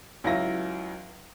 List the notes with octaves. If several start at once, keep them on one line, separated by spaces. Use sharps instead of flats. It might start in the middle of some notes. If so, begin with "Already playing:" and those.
C#2 F#3 E4 F4 A#6